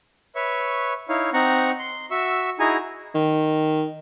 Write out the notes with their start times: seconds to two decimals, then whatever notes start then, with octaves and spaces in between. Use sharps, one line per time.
0.35 B4 C#5 E5 C#6
1.09 D#4 E4 C#5 F5
1.33 C4 D#4 F#5 A#5 C#6
1.79 C6
2.11 F#4 E5 C#6 E6
2.59 D#4 E4 F#4 G#4 G#5 A#5
3.14 D#3